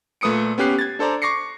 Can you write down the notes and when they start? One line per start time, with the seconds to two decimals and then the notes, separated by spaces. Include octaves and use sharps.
0.21 A#2 A3 B4 D#6 C#7 D7
0.58 B3 C#4 G4 F#6 C7
0.79 G#6 A6
0.99 D4 A4 C5 D5 A#5
1.22 C#6 D6 A#6 C7 C#7